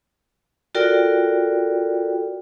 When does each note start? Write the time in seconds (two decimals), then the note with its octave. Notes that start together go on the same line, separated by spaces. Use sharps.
0.75 F4 F#4 A4 A#4 D5 G5